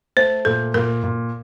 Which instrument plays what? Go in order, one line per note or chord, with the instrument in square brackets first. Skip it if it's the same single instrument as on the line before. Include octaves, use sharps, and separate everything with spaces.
[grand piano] A3 [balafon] C5
[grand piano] A#2 [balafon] A4
[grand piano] A#2 [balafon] A#4
[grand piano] A#2